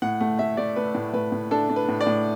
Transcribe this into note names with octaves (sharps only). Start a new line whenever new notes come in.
A2 F#5
A3 F#5
A3 E5
A3 D5
A3 B4
A2
A2 B4
A2
D4 A4
D4
B4
A2
D5
A2